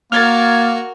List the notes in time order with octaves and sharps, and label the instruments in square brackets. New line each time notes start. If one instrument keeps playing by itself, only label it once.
[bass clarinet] A#3 [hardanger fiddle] F#4 A#4 [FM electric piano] F6 G#6 A6